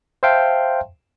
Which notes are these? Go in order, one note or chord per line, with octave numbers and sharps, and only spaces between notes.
C5 E5 F5 G5 A5 C6